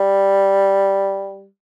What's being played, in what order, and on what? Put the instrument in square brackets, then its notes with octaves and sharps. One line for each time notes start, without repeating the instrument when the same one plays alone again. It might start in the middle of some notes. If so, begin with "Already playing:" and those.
Already playing: [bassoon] G3